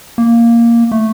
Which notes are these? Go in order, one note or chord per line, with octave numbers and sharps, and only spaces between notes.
A#3
A3